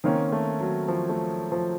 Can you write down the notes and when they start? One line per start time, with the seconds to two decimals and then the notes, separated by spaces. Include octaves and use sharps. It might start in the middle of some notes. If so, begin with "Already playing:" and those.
0.04 D#3 A#3 C4 C#4
0.32 A3
0.60 F#3
0.88 F3
1.09 A3
1.52 F3